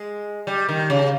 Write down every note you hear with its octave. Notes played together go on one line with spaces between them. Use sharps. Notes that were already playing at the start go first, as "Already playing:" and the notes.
Already playing: G#3
G3
D#3
C#3